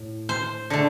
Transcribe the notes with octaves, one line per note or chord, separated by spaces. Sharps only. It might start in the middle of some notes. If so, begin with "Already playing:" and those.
Already playing: A2
C5
D3 A3